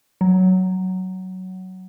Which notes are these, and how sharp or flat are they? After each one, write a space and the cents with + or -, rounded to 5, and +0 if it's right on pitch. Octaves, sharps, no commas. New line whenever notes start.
F#3 +10